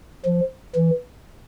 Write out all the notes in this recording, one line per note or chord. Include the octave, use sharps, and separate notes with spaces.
F3
E3